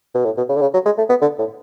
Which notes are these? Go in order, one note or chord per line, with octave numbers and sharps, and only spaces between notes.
B2
A2
B2
C#3
D3
C#3
F#3
G#3
A3
B3
D3
A2